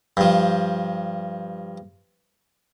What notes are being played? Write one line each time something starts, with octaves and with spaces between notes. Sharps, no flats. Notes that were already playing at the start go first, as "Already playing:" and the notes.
G2 F3